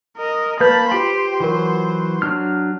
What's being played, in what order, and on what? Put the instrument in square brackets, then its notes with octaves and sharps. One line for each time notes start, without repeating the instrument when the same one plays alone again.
[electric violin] A#4 D#5
[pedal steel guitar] A#3 G6 [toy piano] B4 C#5 [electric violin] A5 B5
[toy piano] F4 G5 [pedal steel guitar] G4 [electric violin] C5
[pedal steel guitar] E3 F#3 [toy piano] F4 A#4
[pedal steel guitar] F#3 D4 F6